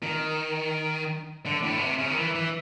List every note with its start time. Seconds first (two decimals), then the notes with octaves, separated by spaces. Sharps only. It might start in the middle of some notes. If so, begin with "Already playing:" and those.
0.03 D#3
1.46 D3
1.63 A2
1.77 B2
1.81 C3
1.99 C#3
2.10 D#3
2.17 E3
2.35 E3